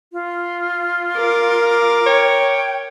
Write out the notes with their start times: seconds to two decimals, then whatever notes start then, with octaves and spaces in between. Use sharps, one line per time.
0.13 F4
1.16 A#4 D6
2.06 C#5 G5